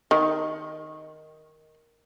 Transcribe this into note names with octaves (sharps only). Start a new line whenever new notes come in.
D#3